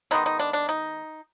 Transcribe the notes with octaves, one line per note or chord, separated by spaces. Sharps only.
D#3 G#3 B3 D#4
D#4
D4
D4
D#4